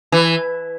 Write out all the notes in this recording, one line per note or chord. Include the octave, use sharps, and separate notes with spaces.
E3